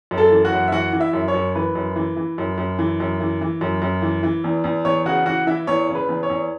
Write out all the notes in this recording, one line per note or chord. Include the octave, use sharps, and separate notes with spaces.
F#2
A4 A5
E3
F#4 F#5
F#2
E5
E3 F#4 F#5
E3
E4 E5
F#2
C#5
F#2
E3 B4
F#2
E3
E3
F#2
F#2
E3
F#2
E3
E3
F#2
F#2
E3
E3
E2
E2
E2 C#5
C#3 F#4 F#5
E3 F#4 F#5
E3 E4 E5
E2 C#5
C#3
B4
E2
C#5
E2